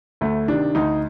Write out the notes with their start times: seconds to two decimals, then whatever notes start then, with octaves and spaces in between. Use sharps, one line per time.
0.21 D2 A3
0.48 C3 D#3 D4
0.75 D2 D#4